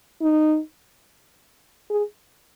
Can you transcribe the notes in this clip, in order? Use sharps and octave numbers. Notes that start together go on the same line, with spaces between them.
D#4
G#4